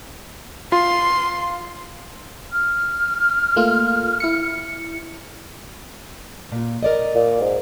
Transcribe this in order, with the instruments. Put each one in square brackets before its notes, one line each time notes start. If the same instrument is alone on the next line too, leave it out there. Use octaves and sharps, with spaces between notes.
[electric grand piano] F4 [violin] C6
[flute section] F6
[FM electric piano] A3 A#3 F4
E4 C#7
[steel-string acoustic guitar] A#2
A#4 D5 D#5
[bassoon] A#2
G#2